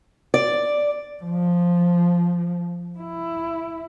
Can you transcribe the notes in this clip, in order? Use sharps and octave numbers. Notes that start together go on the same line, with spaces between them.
D5
F3
E4